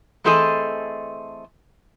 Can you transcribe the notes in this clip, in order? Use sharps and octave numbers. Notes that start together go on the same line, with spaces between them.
E3 A3 C4 G#4 A4 D#5